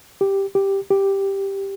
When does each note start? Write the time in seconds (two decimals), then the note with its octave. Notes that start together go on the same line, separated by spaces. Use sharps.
0.21 G4
0.55 G4
0.90 G4